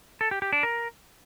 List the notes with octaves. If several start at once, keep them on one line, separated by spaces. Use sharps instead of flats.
A4
G4
G4
D4
A#4